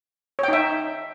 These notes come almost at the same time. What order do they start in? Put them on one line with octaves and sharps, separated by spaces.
C#5 G5 D#4 E5